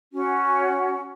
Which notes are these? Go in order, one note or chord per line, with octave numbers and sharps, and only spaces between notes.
C#4 F#4